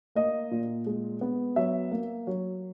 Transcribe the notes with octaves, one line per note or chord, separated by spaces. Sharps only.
A#3 D#5
A#2
G#3
B3
F#3 E5
A#3
F#3